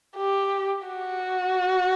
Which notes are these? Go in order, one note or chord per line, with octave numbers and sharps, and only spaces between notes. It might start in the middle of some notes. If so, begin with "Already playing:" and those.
G4
F#4